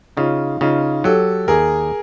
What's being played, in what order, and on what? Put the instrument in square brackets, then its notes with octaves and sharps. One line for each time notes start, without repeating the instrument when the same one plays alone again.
[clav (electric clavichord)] C#3 [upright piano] D#4 F4
[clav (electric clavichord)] C#3 [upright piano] D#4 F4
[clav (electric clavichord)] F#3 [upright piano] G4 A4
[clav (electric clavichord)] D#2 [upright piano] G#4 A#4